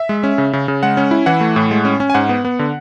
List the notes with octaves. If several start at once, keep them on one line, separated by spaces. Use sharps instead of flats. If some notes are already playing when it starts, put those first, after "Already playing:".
Already playing: E5
G#3
C#4
C#3
C#3
C#3
G#3 F#5
C#4
E4
E3 F#5
A3
A2
G#3
C#4
C#4
G#5
G#2 F#5
B3
B3
D3